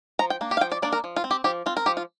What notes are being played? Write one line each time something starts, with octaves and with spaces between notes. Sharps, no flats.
F3 A#5
G5
A#3 D4
G4
F5
F3 G5
D5
A#3 D4 D5
A#4
F3
F4
C4
G4
F3 G4
C4 F4
A#4
F3 G4
F4